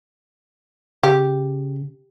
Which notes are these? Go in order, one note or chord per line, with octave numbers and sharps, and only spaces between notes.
C#3 G4